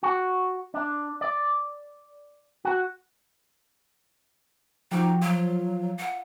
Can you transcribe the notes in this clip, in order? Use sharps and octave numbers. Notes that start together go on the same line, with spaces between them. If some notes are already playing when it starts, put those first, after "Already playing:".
F#4
D4
D5
F#4
F3 D4 D#4 F#4 G4
F#3 F4
F#5